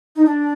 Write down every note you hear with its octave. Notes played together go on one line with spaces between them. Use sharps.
D#4
D4